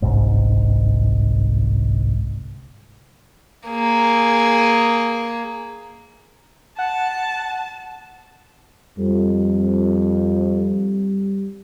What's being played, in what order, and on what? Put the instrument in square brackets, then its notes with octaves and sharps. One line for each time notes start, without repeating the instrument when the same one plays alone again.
[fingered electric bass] G1 C2 G#2
[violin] A#3 G#4
[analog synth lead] F#5 [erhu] A5
[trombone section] F2 [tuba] G3